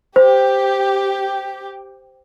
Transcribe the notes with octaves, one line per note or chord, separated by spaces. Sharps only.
G4 C5